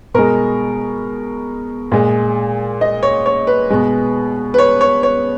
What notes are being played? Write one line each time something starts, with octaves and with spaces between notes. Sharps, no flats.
B2 G#3 A#4
A#2 G#3
D#5
C#5
C#5
B4
B2 G#3
B4
C#5
C#5
C#5